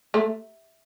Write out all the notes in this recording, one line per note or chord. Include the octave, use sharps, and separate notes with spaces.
A3